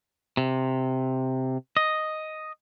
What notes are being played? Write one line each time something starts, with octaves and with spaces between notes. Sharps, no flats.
C3
D#5